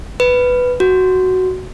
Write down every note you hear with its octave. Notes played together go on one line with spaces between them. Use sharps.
B4
F#4